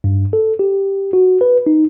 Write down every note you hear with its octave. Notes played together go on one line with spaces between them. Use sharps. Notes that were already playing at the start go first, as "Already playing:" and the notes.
G2
A4
G4
F#4
B4
D#4